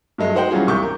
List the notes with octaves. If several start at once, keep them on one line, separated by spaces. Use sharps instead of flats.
G2 F#3 G#3 A3
D#4 F#4 C5 F#5 G5
E3 F#3 G3 C#4 F4 G#4
C2 D#3 C#6 D6 G6
A#4